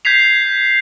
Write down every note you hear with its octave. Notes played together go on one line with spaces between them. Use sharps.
G6 G#6 B6 C7 F7